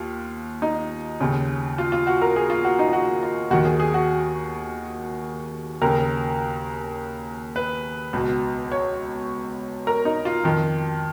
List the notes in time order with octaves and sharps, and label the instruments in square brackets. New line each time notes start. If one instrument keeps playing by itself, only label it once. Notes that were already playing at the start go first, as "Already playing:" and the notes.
Already playing: [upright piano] D#2 F4
D#4
D#2 C#3
F4
F4
F#4
A#4
G#4
F4
F#4
D#4
F4
F#4
F4
D#2 D#3 F#4
G#4
G#4
F#4
D#2 C#3 A#4
B4
C#2 B2
C#5
A#4
D#4
F4
F2 D#3